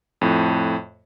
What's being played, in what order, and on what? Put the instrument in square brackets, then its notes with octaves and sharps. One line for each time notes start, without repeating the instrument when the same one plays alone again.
[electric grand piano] F2 A2